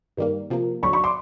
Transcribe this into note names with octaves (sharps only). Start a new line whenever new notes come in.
G2 D#3 G3 A#3
C3 F3 A#3
D#2 D3 F#3 B5 C#6
B5 C#6
C6 D6